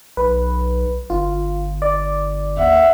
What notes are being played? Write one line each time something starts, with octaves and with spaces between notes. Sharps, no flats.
B1 B4
G1 F4
D5
D#2 E5 F#5